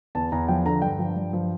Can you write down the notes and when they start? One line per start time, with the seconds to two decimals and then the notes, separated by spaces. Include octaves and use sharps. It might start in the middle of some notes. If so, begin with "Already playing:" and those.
0.15 E2 A5
0.32 E2 A#5
0.49 F3 G5
0.65 D3 A#5
0.82 G2 G5
0.99 F3
1.16 G2
1.33 F3